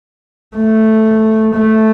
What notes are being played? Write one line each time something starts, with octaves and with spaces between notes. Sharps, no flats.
A3
A3